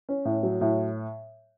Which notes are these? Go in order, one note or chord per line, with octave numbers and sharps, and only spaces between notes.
C#4
A2
F#3
A2